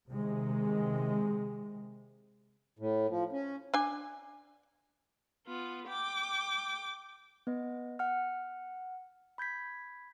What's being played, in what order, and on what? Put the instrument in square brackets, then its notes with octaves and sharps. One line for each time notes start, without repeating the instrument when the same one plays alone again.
[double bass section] C3 D#3 G#3
[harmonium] A2
F3
C#4
[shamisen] D4 G#5
[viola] B3 F4
G5 D6
[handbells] B3 B4 D#5
F#5 F6
B5 G6 G#6 B6